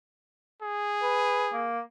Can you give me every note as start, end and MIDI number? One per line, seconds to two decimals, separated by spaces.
0.62 1.72 68
1.03 1.46 71
1.53 1.80 58